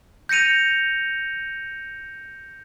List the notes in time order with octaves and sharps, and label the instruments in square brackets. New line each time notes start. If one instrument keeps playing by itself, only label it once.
[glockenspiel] G6 A#6 C#7 D#7 F7